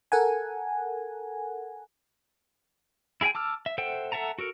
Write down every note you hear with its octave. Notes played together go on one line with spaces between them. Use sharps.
A4 A#4 F#5 G#5
E4 G#4 E5 G5 G#5
A5 D6 E6 F6
E5
A4 C5 E5 F#5 G5
A4 E5 F#5 A5 A#5
F#4 A4 A#4